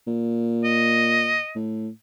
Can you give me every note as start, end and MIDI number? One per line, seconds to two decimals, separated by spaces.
0.07 1.38 46
0.64 1.53 75
1.55 1.89 45